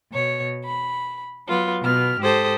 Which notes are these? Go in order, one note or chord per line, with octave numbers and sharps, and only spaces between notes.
B2 C#5
B5
F#3 B3 F4
B2 B3 F6
G#2 G4 A4 C5 D#6